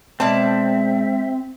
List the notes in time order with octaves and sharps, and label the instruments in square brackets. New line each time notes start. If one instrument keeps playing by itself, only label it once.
[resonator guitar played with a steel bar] B2 D5 A5 [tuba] G#3 [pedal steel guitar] C4 [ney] E5